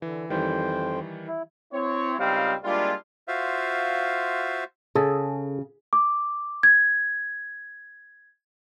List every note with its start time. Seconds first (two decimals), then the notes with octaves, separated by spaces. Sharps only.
0.02 D3 E3
0.30 F2 D#3 E3 G3 C5 G5
1.27 E4
1.73 C4 E4 C#5
2.19 C#2 G3 C4 D#4 F5
2.64 G3 G#3 A#3 D4 E4 F4
3.28 F4 F#4 C5 E5 F5
4.95 C#3 G#4 A4 A5
5.93 D6
6.63 G#6